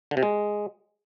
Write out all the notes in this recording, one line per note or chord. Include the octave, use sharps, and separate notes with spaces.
D3
C3
G#3